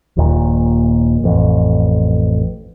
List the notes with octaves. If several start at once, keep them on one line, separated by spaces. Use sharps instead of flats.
D#1 A#1 D#2 A#2
A1 F2